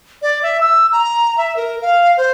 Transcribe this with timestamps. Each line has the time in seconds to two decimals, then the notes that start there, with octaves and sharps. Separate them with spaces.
0.22 D5
0.43 E5
0.61 E6
0.92 A#5
1.38 E5
1.57 A#4
1.82 F5
2.17 C5